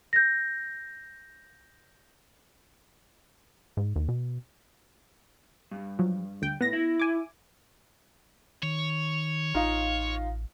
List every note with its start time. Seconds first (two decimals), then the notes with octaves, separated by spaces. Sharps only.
0.13 G6 A#6
3.77 G#2
3.96 D#2
4.08 B2
5.71 G2
5.99 F3 F#3
6.42 D2 G5
6.61 A2 B3 A#6
6.73 E4
7.00 G#5 D6
8.63 D#3 C#5
9.55 A1 D#4 F4